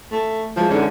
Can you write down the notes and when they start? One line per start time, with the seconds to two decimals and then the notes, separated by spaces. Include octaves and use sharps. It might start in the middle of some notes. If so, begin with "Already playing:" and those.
0.12 A3
0.56 E3 F3 G#3 G#4
0.70 G#2 D3 C#4